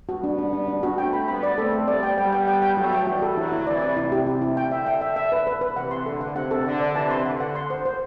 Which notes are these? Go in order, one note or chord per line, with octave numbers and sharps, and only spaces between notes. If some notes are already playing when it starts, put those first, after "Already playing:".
G3 B3 F#4
D4
D4
D4
D4
F#4
A3 C4 G5
B5
G3 B3 B5
D5
A3 C4 A4
A4
G3 B3 D5
G5
G3 B3 G5
G5
G5
G5
F#3 A3 F#4
G5
E3 G3 F#4
A4
D3 F#3 E4
E4
C3 E3 D5
D5
C3 E4
G4
E4
E4
D3 G5
E5
G5
E5
E5
B4
B4
B4
C3 E3 F#5
C6
D3 A4
F#5
C3 F#5
A4
D3 A4
D5
C3 E3 A5
C6
D3 F#5
F#5
C6
C5
C5